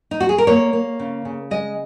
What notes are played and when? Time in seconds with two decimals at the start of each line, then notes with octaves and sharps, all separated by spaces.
0.11 D#4
0.20 F#4
0.29 G#4
0.38 A#4
0.47 A#3 C#5
0.73 A#3
1.00 C#3
1.25 C#3
1.51 G#3 D#5